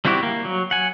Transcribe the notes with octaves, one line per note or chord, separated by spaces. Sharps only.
G3 C4 E4 F#4 G4
A#3
F#3
F#5 G#5